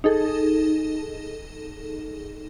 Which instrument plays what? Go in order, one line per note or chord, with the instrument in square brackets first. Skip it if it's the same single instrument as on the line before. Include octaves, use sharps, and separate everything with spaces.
[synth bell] D#4 G#4 A4